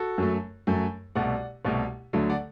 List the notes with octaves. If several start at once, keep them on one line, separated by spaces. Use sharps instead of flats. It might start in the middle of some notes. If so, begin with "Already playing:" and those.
Already playing: F#4 A4
F#2 F#3 A3
F#2 F#3 A3
C2 B2 A3 D5 F#5
C2 B2 A3
D2 D3 F#3 A3
D5 F#5